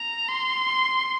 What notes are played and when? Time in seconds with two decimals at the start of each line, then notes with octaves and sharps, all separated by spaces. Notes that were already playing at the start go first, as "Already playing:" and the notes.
Already playing: A#5
0.29 C6